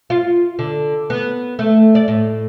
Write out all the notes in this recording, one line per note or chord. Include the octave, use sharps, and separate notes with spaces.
F4
D3
B3
A3
D5
A2